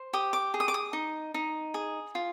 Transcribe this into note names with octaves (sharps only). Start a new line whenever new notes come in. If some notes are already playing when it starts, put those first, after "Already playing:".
Already playing: C5
G4 D#6
D6
G#4
D#6
D6
D#6
D#4
D#4
G#4
F4